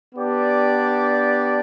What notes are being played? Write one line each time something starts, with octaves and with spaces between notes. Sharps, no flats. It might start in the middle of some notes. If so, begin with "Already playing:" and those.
B3 D4 G4 D5